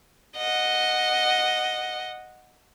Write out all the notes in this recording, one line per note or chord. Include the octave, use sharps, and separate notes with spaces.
D#5 F#5